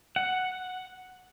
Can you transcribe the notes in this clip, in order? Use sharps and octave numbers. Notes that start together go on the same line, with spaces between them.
F#5